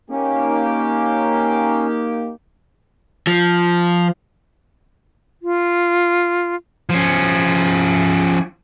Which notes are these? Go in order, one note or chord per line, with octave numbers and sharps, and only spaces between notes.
A#3 C#4 D#4 G4
F3
F4
F3 C#4